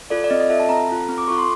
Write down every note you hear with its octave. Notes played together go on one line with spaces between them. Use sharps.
F4 A4 D5
D5
C4 D#5
D#5
F4 A4 E5
A5
C4 A#5
F4 A4
C4
D6
F4 A4 C#6
C6